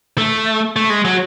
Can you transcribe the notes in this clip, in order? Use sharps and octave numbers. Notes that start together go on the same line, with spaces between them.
A3
A3
G#3
F#3